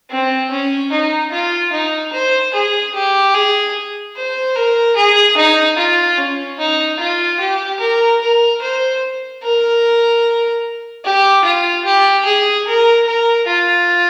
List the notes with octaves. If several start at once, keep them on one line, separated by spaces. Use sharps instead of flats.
C4
C#4
D#4
F4
D#4
C5
G#4
G4
G#4
C5
A#4
G#4
D#4
F4
C#4
D#4
F4
G4
A#4
A#4
C5
A#4
G4
F4
G4
G#4
A#4
A#4
F4